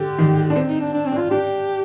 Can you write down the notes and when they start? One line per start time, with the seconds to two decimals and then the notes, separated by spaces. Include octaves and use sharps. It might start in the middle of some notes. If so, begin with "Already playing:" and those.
Already playing: D3 G4
0.18 D#3
0.50 D4
0.56 C4
0.68 D#4
0.81 D4
0.94 D4
1.06 C4
1.12 D4
1.18 F4
1.31 D4 G4